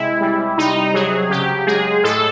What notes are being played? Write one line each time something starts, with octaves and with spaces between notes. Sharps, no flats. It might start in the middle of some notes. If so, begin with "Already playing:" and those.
Already playing: C3 G#3 E4
G3
C3 D#4
F#3 G#4
C#3 G4
G#3 G#4
A2 A4